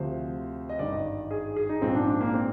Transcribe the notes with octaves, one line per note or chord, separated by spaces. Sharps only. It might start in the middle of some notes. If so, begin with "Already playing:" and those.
Already playing: D2 C3 F3 C5
D#5
G#1 G2 D#3 D5
D#5
G#4
G#4
D#4
A#1 G#2 F3 C4
D4
D4
A#3
C4